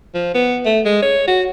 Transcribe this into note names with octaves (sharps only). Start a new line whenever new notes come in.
F3
B3
A3
G#3
C#5
F#4